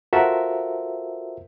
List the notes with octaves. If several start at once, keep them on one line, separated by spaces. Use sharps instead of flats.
F4 F#4 A4 A#4 C5 E5